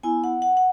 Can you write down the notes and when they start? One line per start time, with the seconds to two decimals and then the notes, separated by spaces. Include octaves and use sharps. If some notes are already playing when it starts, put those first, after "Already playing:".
0.03 B3 E4 G#5
0.24 F#5
0.42 F#5
0.57 F#5